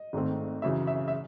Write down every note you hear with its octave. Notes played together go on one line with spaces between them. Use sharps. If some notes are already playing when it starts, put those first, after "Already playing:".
Already playing: D#5
G#1 G#2 D#3 A3 C4
F#2 C#3 E3 E5
E5
E5